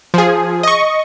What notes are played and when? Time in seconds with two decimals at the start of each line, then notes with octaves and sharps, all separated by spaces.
0.14 F3 G#4
0.63 D#5 C#6